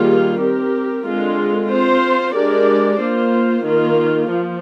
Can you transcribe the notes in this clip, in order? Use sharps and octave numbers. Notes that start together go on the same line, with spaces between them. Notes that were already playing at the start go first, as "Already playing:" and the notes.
Already playing: D#3 G3 A#3 F4 G#4
C4 G4 A#4
D3 G#3 C4 F4
C4 F4 C5
G#3 D4 G4 A#4 D5
A#3 F4 C5
D#3 A#3 F4
F3